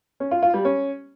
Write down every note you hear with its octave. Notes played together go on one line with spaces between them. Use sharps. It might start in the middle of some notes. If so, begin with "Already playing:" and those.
C#4
F4
F4
G3
C#4